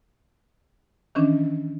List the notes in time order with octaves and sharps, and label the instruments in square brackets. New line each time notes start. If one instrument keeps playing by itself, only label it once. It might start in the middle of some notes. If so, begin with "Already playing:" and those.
[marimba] D#3 E3 C#4 D4